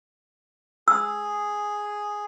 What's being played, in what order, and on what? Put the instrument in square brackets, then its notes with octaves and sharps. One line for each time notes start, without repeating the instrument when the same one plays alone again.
[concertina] G#4 [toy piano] E6